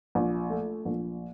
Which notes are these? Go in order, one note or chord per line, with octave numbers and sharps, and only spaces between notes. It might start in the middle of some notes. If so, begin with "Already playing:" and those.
A#1
A3
A#1